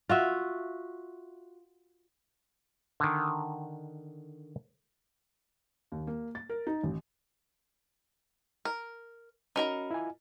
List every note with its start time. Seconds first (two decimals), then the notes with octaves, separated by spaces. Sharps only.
0.09 F4 F#4 E5
3.00 D3 D#3
5.92 D#2
6.07 A#3
6.35 A6
6.49 A#4
6.67 D#4
6.83 A1
8.65 A#4
9.56 C#4 D#4 F#4 A#4 A#5 B5
9.91 E4 F4 G#5